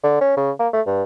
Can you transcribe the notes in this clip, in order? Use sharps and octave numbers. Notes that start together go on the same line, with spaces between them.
D3
C#4
C#3
A#3
A3
G2